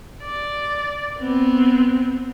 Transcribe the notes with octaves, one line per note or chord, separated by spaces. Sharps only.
D5
B3 C4